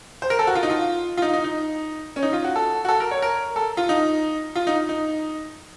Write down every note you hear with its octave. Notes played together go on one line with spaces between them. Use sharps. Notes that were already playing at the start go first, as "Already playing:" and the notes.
C5
A#4
A4
F#4
F4
D#4
F4
F4
D#4
D#4
D#4
C#4
D#4
F4
F#4
A4
F#4
A4
A#4
C#5
A#4
A4
F4
D#4
F4
D#4
D#4